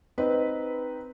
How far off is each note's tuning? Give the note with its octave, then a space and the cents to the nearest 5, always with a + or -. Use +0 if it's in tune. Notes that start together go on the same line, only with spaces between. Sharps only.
C4 -10 D#4 +0 B4 +0